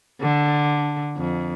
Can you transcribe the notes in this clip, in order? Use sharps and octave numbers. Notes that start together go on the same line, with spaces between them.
D3
F2